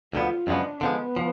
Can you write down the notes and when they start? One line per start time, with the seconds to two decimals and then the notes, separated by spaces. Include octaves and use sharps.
0.13 D2 D3 F3 B3 F4
0.47 F#2 C#3 F3 G#3 B3 D4
0.81 D3 F3 G#3 B3
1.16 F3